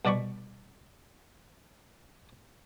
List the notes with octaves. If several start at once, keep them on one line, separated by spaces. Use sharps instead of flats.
C2 B2 D5 B5 C#6